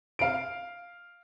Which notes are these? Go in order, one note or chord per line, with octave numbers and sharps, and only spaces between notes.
F5 D7